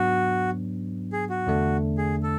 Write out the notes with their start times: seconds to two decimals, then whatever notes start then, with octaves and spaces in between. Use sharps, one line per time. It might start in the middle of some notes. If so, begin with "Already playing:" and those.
Already playing: G#2 F#3 B3 D4 F#4
1.13 G#4
1.30 F#4
1.47 E2 D3 A3 D4
1.98 G#4
2.23 A4